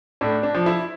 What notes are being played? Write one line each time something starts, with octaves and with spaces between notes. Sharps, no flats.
A2 D4
D4
F3
E4